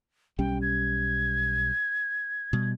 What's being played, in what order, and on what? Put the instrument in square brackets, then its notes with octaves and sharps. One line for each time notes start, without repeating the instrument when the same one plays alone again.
[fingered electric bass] B1 G3 C#4 [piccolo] G5
[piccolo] G#6
[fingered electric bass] B2 G3